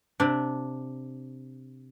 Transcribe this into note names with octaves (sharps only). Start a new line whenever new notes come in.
C3 D4